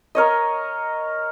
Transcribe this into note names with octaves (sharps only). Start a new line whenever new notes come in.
A#4 C#5 D#5